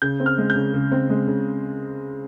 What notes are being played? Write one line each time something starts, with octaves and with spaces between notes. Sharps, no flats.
C#3 G6
C4
F6
G#3
G6
C#3
C#3
C4
G#3
C#3